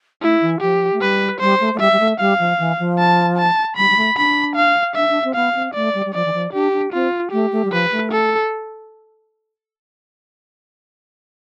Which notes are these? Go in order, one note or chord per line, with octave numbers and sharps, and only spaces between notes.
A3 E4
E3
F3 G4
A3
G3 B4
G3 C5
A3
A3
G3 E5
G3
A3
G3 F5
F3
E3
F3
A5
A5
G3 B5
G3
A3
D4 B5
F5
D4 E5
D4
C4
B3 F5
C4
A3 D5
G3
G3
F3 D5
E3
F3
D4 G4
D4
C4 F4
A3 G4
A3
G3
F3 B4
A3
A4